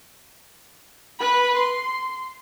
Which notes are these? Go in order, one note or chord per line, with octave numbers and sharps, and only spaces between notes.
B4 B5
C6